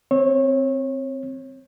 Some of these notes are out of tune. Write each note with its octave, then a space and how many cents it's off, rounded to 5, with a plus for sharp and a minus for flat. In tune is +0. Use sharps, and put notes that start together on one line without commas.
C4 +0 C#5 -25